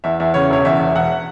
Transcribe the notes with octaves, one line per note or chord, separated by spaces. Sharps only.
E2 E5
E2 E5
C#3 C#5
E1 C#5
E2 E5
E1
E1 F#5